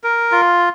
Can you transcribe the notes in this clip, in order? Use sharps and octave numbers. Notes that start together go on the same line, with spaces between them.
A#4
F4